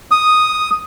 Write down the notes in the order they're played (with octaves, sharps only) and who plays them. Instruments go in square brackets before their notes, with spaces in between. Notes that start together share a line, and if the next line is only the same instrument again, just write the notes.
[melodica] D#6